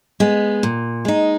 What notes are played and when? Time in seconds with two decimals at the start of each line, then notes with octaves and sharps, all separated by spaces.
0.20 G#3 B3
0.63 A#2
1.05 G#3 D#4